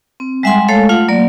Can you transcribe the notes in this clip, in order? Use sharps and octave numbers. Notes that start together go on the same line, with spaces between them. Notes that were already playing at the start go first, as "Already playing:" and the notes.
C4
G3 G#3 E5 F#5 G#5 C6
G#3 A3 A4 C#5 F5
A3 F4 F5 F#5
F#3 A#3 D5